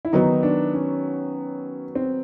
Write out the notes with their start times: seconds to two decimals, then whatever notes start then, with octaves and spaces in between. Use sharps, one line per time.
0.05 E4
0.13 D#3 F#3 B3 D#4
0.43 D4
0.74 C#4
1.95 C4